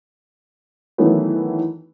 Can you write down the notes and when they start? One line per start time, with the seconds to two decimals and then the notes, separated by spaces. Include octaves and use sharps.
0.98 D#3 E3 F#3 A3 B3